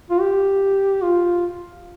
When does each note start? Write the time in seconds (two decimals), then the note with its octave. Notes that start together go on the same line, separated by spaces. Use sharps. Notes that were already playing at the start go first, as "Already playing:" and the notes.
0.10 F4
0.21 G4
1.03 F4